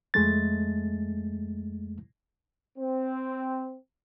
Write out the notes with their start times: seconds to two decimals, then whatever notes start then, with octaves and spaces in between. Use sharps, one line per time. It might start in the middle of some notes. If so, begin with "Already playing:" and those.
0.14 F2 G#3 A3 A6
2.78 C4